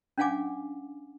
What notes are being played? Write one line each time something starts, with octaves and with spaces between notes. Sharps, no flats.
C#4 D4 F5 F#5 G#5 D6